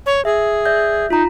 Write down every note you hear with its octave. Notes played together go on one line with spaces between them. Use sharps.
C#5
G#4 E5
D5 E5 G6
D#4 F4 A#5